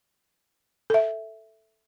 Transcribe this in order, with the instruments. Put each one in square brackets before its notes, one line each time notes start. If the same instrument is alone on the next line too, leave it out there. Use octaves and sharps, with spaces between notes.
[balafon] A4 E5